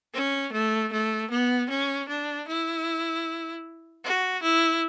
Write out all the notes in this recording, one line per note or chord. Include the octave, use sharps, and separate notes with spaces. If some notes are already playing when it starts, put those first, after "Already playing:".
C#4
A3
A3
B3
C#4
D4
E4
F#4
E4